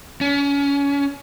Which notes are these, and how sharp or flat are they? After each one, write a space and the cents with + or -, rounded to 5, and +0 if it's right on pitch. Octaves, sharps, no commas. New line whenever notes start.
C#4 +30